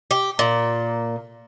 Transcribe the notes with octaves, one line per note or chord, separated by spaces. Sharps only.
G4
A#2